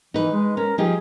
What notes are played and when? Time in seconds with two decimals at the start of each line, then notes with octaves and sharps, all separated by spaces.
0.14 E3 D#4 B4
0.32 G#3
0.57 C#4 A#4
0.78 F3 D#4 G4 G#4